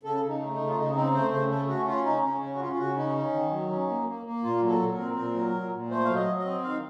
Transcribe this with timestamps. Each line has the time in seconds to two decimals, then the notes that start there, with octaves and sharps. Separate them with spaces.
0.03 C#3 A4
0.21 C#3
0.28 D#4
0.40 A3
0.53 D#4
0.59 C#3
0.67 F4
0.77 C#3 D#4
0.95 C4 D#4
1.14 A3 C5
1.31 C#3 C5
1.50 A3 A4
1.68 C#4 F#4
1.86 C#4 F4
2.05 C#3 D#4
2.23 C#3 C#4
2.41 C#4
2.55 F#4
2.61 C#4 F4
2.73 F4
2.79 C#3 F#4
2.96 C#4 D#4
3.16 C#4
3.33 D#3
3.51 F#3
3.70 C#4
3.88 A#3
4.07 A#3
4.25 A#3
4.44 A#2 F4
4.62 F#3
4.68 A4
4.80 A#2
4.92 A#4
4.98 C4
5.17 A#2 A#4
5.35 F#3
5.54 A#2
5.72 A#2
5.90 A3 C5
6.05 F#3 F5
6.15 D#5
6.27 F#3
6.39 D#5
6.45 C4
6.64 D#3 F5